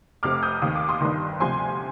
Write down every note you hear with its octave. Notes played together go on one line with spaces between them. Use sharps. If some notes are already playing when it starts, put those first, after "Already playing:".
F1 F2 C3 D6 F6
D#6 G6
D#2 D#3 D#6
D6
C6 D#6
G1 G2 D#3
D2 C3 F3 G#5 C6